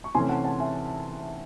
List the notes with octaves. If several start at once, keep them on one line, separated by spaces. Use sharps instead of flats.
C#6
C3 E3 A3 C#4 G#5 C6
F#5 A5
F#5 A5
E5 G#5